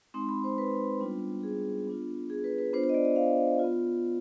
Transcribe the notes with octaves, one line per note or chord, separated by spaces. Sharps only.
G#3 C4 D#4 C6
B5
C5
B4
G3 B3 D4 F4
G#4
B3 D4 F4
G#4
B4
B4
B3 D4 F4 C5
C5
D#5
D5
D#5
F5
B3 F4